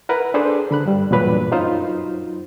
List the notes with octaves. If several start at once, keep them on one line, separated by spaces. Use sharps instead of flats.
E4 A#4 B4 F#5
D4 G#4 A4 B4 C5
D3 B5 F#6
G2 G3
E2 G2 A#2 F#3 D4 B4
F#2 F#3 D#4 F4 C5